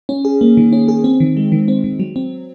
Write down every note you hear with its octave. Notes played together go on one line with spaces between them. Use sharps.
C#4
G#4
A#3
D#3
C#4
G#4
C4
D#3
G#3
D#3
C4
D#3
F#3
C4